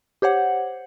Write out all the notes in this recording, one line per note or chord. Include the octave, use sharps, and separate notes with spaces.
G4 C5 C#5 F#5